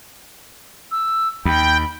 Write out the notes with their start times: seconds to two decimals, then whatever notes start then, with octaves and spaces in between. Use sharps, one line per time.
0.91 E6
1.45 D#2 G5 B5